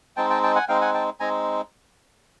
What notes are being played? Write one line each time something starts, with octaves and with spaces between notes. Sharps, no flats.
G#3 C4 D#4 G5 A5
G5 A5
G5 A5
F#5 G#5
G#3 C4 D#4 F5 G5
F#5 G#5
G5 A5
G#3 C4 D#4 G#5 A#5